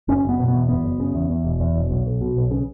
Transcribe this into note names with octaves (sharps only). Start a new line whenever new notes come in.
F#1 C#4
F#1
B3
B2
B3
E2
F#1 B3
F#1
C#3
E2
E2
E1
E2
E1
B1
B1
B2
B1
C#3